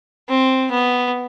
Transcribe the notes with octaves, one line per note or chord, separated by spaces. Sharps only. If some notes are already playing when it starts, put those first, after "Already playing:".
C4
B3